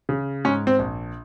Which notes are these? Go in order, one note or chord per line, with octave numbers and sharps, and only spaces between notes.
C#3
G#2 C#4
C4
A#1